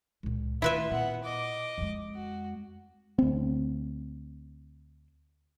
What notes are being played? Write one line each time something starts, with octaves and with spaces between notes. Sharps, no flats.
C#2 A#2
D#3 A3 E4 F4 B4 E5
A#2 B3 F#5
D#5 D6
F2 G#3
F#4
D2 C4